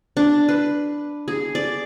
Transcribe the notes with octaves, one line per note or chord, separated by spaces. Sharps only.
D4
B4
G#4
D5